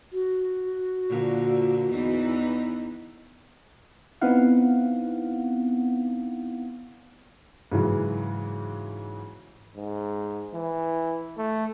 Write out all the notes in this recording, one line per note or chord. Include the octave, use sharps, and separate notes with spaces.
F#4
A#2 D3 F3
E2 E3 D#4
B3 C4 D#4 E4 F5 F#5
G#2 C#3 E3 F#3
G#2
E3
A3